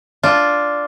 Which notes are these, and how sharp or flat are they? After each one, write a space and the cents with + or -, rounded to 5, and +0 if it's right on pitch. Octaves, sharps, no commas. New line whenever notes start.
D4 -5 F4 +0